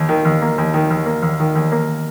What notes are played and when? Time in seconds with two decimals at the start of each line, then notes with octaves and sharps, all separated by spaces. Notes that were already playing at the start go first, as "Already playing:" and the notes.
Already playing: D#2
0.09 D#3
0.25 D#2
0.42 A#3
0.58 D#2
0.74 D#3
0.91 D#2
1.06 A#3
1.22 D#2
1.40 D#3
1.55 D#2
1.72 A#3